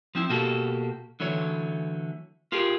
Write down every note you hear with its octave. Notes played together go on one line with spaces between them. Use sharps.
F3 C4 E4
B2 A#3 F#4 G4 A4
D3 E3 F#3 A3 C#5
F4 G4 G#4 A#4